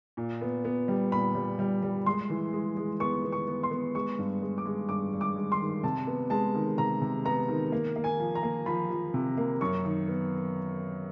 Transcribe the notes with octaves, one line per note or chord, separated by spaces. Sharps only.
A#2
B3
B3
G3
A#2 B5
G3
G3
G3
G#3 C6
E3
G#3
G#3
B3 C#6
B3
C#6
B3
C6
B3
G#3 C#6
G2
G#3
D6
G#3
G2 D6
G2
D6
G#3
C6
D#3
C3 A5
B3
G#3 A5
D#3
C3 A#5
C3
B3 A#5
D#3
A#3
A#3
G#5
F3
A#5
A#3
F3 B5
F3
C3
A#3
F#2 C#6
D#3
B3